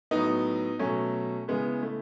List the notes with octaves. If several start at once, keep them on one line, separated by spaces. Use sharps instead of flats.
A2 F#3 B3 D#4
B2 F#3 A3 C#4
C#3 E3 G#3 B3
A3